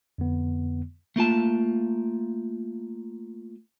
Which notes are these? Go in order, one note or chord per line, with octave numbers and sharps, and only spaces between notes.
F2 D3 B3
A3 A#3 F4 A5